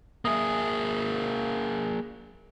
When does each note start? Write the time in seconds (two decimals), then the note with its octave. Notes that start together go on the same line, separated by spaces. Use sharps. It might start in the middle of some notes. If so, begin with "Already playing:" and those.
0.25 A#3 G#4 E5 D#6